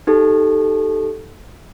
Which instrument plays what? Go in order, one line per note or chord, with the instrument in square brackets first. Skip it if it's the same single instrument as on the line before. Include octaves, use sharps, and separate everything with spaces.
[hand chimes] D#4 G4 A4